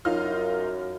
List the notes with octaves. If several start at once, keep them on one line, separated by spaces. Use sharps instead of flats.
F#2 D#4 F4 F6